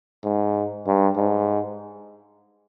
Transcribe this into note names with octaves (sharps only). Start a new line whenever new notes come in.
G#2
G2
G#2